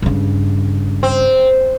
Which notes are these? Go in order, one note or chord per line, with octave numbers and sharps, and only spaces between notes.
G2 C#3
C4